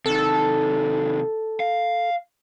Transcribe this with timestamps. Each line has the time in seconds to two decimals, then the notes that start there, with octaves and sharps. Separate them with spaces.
0.06 C3 D#3 A4
1.60 F5